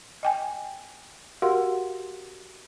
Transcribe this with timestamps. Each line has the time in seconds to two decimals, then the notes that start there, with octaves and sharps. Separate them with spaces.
0.23 D#5 G5 G#5
1.42 F#4 G4 A#4 F5 F#5 C6